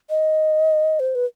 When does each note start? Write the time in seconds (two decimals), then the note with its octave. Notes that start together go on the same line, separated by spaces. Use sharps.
0.10 D#5
1.00 C5
1.15 B4